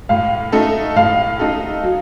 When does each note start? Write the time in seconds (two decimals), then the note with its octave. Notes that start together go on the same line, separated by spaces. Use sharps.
0.09 A2 F5
0.52 A3 D#4 A4
0.96 A2 F5
1.40 A3 D#4 A4
1.83 F#3